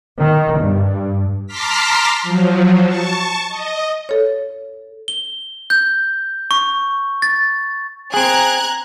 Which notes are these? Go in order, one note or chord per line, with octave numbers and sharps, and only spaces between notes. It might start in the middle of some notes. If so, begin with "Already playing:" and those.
D#3
G2
A5 A#5 C6 D6 F6 B6
F3 F#3
A5 C#6
D#5
A4 C#5
G7
G6
C#6
A6
C4 G#4 A#5 F#6 G#6